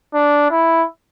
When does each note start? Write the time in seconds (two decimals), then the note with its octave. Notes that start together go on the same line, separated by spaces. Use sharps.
0.14 D4
0.51 E4